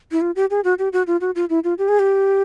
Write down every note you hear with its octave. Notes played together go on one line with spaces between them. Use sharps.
E4
F4
G4
G#4
F#4
G4
F#4
F4
F#4
F4
E4
F4
G4
G#4
G4